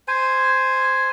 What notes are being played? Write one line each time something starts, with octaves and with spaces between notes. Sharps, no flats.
C5 G#5